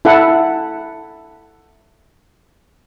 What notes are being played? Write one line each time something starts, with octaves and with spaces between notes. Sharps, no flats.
E4 A4 F#5